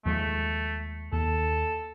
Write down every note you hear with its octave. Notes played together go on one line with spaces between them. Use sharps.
D#2 F3 G#3 A3
D#2 A4